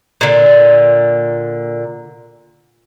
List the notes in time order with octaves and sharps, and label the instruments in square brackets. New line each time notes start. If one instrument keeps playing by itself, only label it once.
[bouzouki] A#2 D3